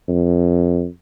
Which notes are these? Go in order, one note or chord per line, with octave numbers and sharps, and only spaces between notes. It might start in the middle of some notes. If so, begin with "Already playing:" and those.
F2